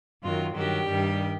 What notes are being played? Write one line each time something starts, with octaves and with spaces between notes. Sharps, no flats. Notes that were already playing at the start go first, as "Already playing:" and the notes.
F#2 D#3 F#3 F4
G2 D#3 F#3 G4
G2 D#3 G3